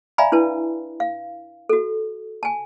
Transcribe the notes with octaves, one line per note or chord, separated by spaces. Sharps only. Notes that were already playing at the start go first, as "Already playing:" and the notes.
D5 E5 F5 G#5 A#5 B5
D4 E4 B4 A5
F5
F#4 A4
G#5 A5